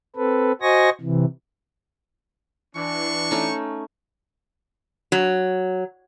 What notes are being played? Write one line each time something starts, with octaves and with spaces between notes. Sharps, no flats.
C4 A4 B4
F#4 C5 D#5 G#5 C#6 A#6
C3 E3
E3 D4 C#6
A3 C#4 D#4
F#3